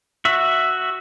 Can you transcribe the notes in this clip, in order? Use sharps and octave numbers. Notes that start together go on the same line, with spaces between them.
F#4 E5